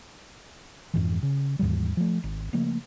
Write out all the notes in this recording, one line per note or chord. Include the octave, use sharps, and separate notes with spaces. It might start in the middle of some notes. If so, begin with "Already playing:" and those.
F2 G#2 E3
C#3
D#2 G#2 E3 G3
F3 A3
G#1
C#3 F3 A3 A#3